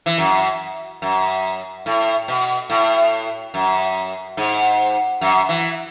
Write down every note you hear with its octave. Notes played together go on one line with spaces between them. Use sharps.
E3
F#2
F#2
A2
B2
A2
F#2
G#2
F#2
E3